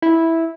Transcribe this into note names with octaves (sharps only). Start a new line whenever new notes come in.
E4